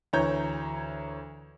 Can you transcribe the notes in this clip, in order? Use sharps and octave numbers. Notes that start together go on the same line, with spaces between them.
D2 E3 C#5 A#5 G6